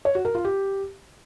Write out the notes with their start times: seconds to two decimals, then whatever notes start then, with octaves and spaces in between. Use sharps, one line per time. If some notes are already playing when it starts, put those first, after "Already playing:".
0.05 C#5
0.15 F#4
0.25 A#4
0.35 F4
0.45 G4